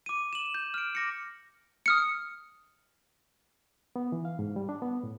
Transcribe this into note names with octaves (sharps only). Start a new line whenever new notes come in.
D6 D#7
E7 F#7
G6
F6 D7
D6 A#6 C#7
D#6 F6 C#7
B3
E3
F5
G#2
G3
D4
B3
A2